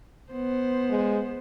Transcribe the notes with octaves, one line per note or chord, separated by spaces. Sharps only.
B3 C5
G#3